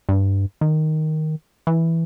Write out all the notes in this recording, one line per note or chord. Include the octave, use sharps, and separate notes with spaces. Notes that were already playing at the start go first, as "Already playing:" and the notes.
G2
D#3
E3